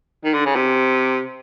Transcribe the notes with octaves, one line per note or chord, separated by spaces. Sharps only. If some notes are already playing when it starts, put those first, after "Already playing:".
D#3
D3
C#3
C3